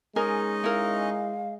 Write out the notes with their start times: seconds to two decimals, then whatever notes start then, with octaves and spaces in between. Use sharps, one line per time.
0.16 G#3 C#4 D#4 G#4 A#4 D#5
0.64 E4 A#4 F5